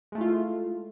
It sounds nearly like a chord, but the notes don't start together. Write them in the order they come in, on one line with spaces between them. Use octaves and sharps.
G#3 A3 E4 F4